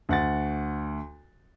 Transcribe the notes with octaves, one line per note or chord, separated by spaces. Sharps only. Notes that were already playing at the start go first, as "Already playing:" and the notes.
D2 F#5 A6